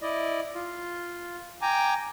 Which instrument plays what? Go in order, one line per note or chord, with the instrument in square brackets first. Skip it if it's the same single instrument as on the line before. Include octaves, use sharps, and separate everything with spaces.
[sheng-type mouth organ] E4 D5 D#5
F4
G5 G#5 A#5 D6